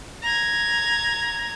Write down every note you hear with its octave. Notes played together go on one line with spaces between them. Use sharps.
A#5 G#6